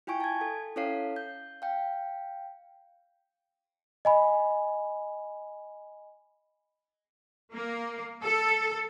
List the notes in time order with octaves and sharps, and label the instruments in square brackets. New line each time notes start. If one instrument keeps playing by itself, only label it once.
[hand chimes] E4 F4 G5 G#5 C#6 D7
A5 G#6
A4
C#4 E4 A4 C#5 F5 C7
G6
F5 G5
[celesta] D#5 G#5 B5
[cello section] A#3
A4